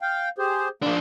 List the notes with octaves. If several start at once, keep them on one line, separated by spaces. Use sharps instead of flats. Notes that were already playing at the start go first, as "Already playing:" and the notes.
F5 G5
G4 G#4 C5
F3 A#3 D4